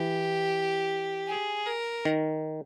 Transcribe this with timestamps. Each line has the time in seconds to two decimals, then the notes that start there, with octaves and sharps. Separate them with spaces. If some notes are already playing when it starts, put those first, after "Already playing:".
Already playing: E3 G4
1.27 G#4
1.66 A#4
2.05 D#3